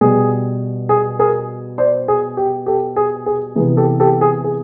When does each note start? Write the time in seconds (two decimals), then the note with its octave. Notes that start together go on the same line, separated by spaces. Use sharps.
0.01 B2 G3 B3 G#4
0.89 G#4
1.19 G#4 A#4
1.78 C5 D5
2.08 G#4
2.37 G4
2.66 G4 A4
2.96 G#4
3.26 G#4
3.56 C3 E3 G#3 B3 G#4
3.77 G4 A4
4.00 G4 A4
4.21 G#4
4.44 G#4